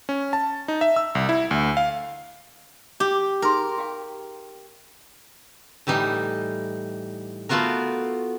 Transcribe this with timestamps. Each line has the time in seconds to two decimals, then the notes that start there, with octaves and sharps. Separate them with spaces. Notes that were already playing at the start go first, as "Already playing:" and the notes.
0.09 C#4
0.33 A5
0.68 D#4
0.81 E5
0.96 E6
1.15 C2
1.29 E4
1.51 D2
1.77 F5
3.00 G4
3.42 D#4 G#4 A#4 C6
3.78 G4 F5 G5
5.87 A2 E3 G3 D#4
7.49 A3 B3 F4 F#4 A#4